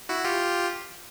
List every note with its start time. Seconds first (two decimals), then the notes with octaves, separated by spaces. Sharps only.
0.09 E4 F#4
0.24 F4 G4